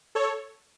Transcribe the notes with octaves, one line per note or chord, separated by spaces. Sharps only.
A4 C#5